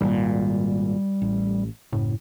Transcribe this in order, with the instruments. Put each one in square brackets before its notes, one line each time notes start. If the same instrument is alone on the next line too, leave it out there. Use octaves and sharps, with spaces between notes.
[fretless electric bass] G#1 A#2 [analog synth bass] G3
[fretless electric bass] A1
[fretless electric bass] F#1 [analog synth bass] A2